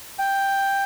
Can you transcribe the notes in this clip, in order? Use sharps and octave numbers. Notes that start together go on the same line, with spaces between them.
G5